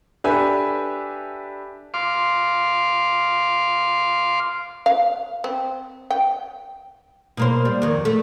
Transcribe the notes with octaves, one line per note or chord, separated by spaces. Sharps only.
D4 G4 A4 B4 E5 G#5
F5 C6 D6
F5
C4
G5
B2 A#3 C5
G3
F2 D#3
A3